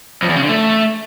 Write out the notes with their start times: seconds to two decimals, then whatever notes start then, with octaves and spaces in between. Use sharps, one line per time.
0.22 F2
0.29 E2
0.36 C#3
0.42 D3
0.49 A3